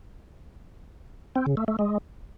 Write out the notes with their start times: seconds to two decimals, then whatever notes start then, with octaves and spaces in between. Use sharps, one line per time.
1.35 C4
1.46 C#3
1.57 A3
1.68 A3
1.79 G#3